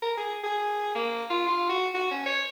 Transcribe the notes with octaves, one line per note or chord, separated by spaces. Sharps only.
A#4
G#4
G#4
A#3
F4
F4
F#4
F#4
C#4
C#5